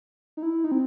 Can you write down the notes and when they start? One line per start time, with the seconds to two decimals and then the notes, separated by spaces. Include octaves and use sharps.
0.37 D#4
0.43 E4
0.64 D#4
0.72 C4